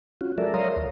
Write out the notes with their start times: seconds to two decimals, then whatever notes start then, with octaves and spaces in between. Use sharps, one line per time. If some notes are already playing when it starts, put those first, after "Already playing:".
0.21 C#4 F4 F#4
0.38 F#3 G#3 A4 A#4 D5 E5
0.54 A#4 C#5 F5 A#5 C6 D#6
0.76 D#2